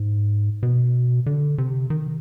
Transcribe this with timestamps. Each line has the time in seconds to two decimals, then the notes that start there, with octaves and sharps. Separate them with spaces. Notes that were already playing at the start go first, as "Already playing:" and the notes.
Already playing: G#2
0.63 B2
1.26 D3
1.58 C3
1.90 D#3